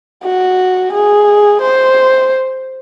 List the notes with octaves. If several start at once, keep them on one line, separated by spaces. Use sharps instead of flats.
F#4
G#4
C5